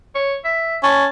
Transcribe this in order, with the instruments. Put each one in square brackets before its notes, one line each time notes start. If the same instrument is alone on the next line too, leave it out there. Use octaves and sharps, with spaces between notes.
[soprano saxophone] C#5
E5
[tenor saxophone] C#4 [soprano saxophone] A5